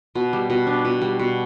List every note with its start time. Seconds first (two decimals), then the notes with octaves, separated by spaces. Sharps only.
0.15 B2
0.33 G3
0.50 B2
0.67 D4
0.85 B2
1.02 G3
1.19 B2